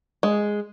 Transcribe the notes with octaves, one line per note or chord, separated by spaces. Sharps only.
G#3